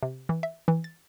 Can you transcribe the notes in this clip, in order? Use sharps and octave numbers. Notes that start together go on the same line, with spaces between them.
C3
E3
E5
E3
A6